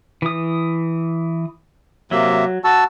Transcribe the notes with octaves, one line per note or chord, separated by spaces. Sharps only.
E3 D#6
C3 F#3 A#3 E5
F#4 A5 E6